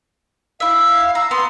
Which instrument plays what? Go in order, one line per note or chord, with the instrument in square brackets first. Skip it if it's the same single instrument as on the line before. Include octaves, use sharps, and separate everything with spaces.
[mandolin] E4 E5 [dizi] F5
[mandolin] A#5 [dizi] E6
[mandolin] B3 [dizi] C6